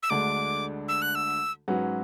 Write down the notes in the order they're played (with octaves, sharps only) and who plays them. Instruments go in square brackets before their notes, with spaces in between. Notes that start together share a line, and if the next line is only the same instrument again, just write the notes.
[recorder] E6
[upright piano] D2 D3 G#3 D4 [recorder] D6
[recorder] E6
F#6
E6
[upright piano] G#2 F#3 C#4 F#4 B4